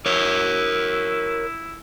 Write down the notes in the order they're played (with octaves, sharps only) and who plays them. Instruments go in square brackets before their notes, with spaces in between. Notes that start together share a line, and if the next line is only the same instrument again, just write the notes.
[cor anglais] E4 [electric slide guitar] A#4 C#5